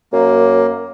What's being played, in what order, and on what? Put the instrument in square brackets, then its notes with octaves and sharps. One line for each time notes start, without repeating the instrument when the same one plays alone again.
[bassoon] F#2 [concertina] A#3